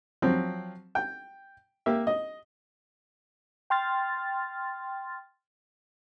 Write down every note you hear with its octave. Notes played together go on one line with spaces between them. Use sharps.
F3 F#3 C4
G5
A#3 G4 E5
D#5
G5 C6 F6 A6